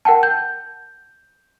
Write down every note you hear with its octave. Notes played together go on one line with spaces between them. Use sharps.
A#4 F#5 G5 A5
G6